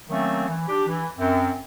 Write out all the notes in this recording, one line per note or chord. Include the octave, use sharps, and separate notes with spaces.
D#3 F#3 A3 A#3 C4 C#4
E3
D4 G4
E3
F#2 C4